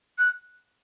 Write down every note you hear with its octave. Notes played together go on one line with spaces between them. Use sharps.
F#6